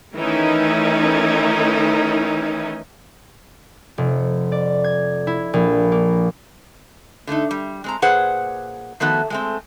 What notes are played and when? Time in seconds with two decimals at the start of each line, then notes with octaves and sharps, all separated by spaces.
0.16 D#3 E3 A3 C#4 D#4 E4
3.98 F1
4.52 D5
4.84 G#6
5.27 E4
5.53 A#1
5.92 A#3
7.27 D3 A3 D4 D#4
7.51 G3
7.84 G#3 C4 A#5
8.02 A#2 G#4 B4 C5 F#5
9.00 D#3 F3 A3 B3 F#4
9.30 G#3 A3 C4